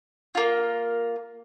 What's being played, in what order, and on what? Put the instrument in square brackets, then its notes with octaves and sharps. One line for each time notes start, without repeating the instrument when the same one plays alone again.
[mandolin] A#3 F4